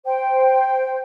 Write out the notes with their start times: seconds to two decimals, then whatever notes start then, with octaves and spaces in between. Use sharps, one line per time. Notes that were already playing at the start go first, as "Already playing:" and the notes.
0.06 C5 G5